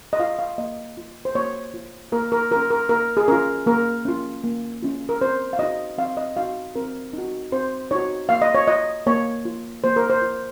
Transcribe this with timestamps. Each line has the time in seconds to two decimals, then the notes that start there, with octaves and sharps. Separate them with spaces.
0.13 D#5
0.20 F4 F5
0.39 F5
0.58 A#3 D#5
0.97 F4
1.25 C5
1.35 A#3 C#5
1.74 F4
2.12 A#3 A#4
2.32 A#4
2.51 F4 A#4
2.56 C#4
2.70 A#4
2.89 A#3 A#4
3.17 G#4
3.28 C#4 F4 A#4
3.66 A#3 A#4
4.05 C#4 F4
4.44 A#3
4.83 C#4 F4
5.09 A#4
5.21 C4 C5
5.53 F5
5.59 D#4 F#4 D#5
5.98 C4 F5
6.17 D#5
6.36 D#4 F#4 F5
6.76 C4 A#4
7.13 D#4 F#4
7.52 C4 C5
7.91 D#4 F#4 C#5
8.29 A#3 F5
8.42 D#5
8.55 C#5
8.67 F4 D#5
9.06 A#3 C#5
9.45 F4
9.84 A#3 C5
9.96 A#4
10.10 C5
10.22 F4